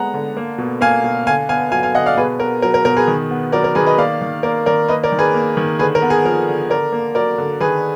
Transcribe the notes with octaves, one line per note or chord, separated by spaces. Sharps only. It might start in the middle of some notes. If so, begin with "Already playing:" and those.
Already playing: D3 G#3 B3 F#5 A#5
D3
A#3
B2
A#3 F5 G#5
B2
D3 F5 G#5
B3 F5 G#5
F#3 F5 G#5
F5 G#5
D3 D#5 F#5
D5 F5
B2 G#4 B4
B3 A#4
F#3 A#4
A#4
B2 A#4
G#4 B4
D#3
B3
F#3 A#4 D5
A#4
D#3 G#4 B4
B4 D#5
A#3 D5 F5
D#3
A#3 A#4 D5
D#3 A#4 D5
A#3 B4 D#5
A#4 D5
D#3
G#4 B4
A#3
D#3
D3 G#4 B4
A#4
B3
G#4
F3 A#4
D3
D3 A#4 D5
A#3
F#3 A#4 D5
D3
D#3 G#4 B4